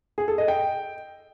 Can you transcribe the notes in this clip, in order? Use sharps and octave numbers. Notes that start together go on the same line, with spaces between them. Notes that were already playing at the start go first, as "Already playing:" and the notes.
G#4
A4
D#5
G5